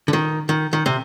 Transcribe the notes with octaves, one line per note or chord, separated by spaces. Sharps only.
D3
D#3
D#3
D#3
C3